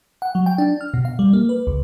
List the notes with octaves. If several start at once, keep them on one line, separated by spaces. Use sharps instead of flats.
F#5
F#3
G5
D4
F6
B2
F5
G3
A#3
B4
C#2